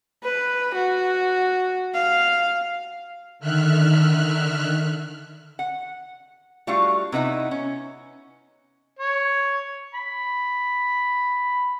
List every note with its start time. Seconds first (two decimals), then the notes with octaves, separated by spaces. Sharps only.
0.24 B4
0.75 F#4
1.94 F5
3.39 D3 D#3 E5 F6 F#6
5.59 F#5
6.67 G3 A3 D4 F4 F#4 F5
7.12 C3 B3 D#4 E4
7.51 C#4
8.99 C#5
9.94 B5